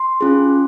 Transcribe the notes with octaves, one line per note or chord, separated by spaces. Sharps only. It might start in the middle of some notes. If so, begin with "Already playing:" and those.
Already playing: C6
C#4 F4 G#4